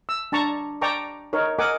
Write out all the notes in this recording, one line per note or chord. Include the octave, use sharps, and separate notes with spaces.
E6
D4 A5 A#5 C#6
D5 G5 A5 A#5 C#6 D6
D#4 A#4 C#5
A#4 D#5 F#5 G#5 D6